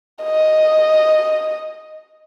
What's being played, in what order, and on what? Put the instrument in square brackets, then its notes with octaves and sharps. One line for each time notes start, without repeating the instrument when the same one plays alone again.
[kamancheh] D#5